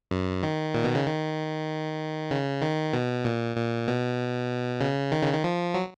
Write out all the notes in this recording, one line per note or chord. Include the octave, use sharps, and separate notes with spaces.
F#2
D#3
A#2
B2
C#3
D#3
C#3
D#3
B2
A#2
A#2
B2
C#3
D#3
C#3
D#3
F3
F#3